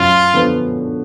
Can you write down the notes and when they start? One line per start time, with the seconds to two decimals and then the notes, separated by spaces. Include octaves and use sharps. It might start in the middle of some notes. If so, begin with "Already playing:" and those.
Already playing: F#2 F4
0.34 D3 F3 B3